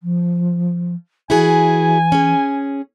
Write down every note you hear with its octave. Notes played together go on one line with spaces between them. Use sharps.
F3
E3 E4 F#4 G#4 G#5
C#4 G#4